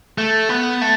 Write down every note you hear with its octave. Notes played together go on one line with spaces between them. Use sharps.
A3
B3
A3